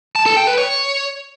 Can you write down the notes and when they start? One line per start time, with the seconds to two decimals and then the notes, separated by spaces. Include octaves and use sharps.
0.16 A5
0.26 A4
0.37 G5
0.47 B4
0.58 C#5